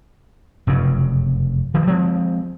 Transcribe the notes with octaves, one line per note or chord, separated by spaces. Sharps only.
F1 F#2 C#3
D#3 F3 G3
F3 G#3 C4